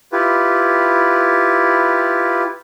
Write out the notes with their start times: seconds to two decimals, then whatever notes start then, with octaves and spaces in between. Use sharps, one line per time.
0.12 E4 F4 G4 B4